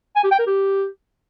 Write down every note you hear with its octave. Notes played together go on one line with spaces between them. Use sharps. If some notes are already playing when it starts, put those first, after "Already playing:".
G#5
G4
G5
A#4
G4